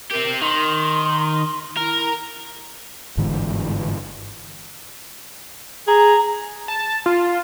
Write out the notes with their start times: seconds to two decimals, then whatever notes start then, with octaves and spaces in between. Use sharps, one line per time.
0.11 C4 G4 A#4
0.42 D#3 C6
1.77 E4 A#4
3.17 G1 G#2 D3 E3
5.87 G#4 A#5
6.68 A5
7.06 F4